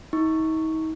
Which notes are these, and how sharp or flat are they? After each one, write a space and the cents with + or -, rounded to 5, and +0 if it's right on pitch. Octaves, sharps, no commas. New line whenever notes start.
D#4 +40 C#6 +0